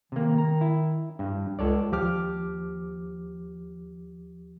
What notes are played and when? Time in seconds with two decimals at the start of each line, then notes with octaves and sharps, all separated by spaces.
0.12 C3 D#3 A#3
0.38 A#5
0.61 E4
1.19 G2
1.59 C#2 A4 C#5 D5
1.92 D#2 F3 G4 D6 F6